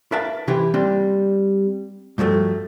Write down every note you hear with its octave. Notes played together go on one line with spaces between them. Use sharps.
A#4 B4 E5 F5 A5
C3 E3 E4 G4 B4 C5
G3 A#3 C4 D4
G2 F3 F#3 A3